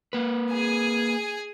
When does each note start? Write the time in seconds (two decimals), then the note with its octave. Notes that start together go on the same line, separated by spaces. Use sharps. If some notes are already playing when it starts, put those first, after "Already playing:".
0.13 A#3 B4
0.52 G#4 G#5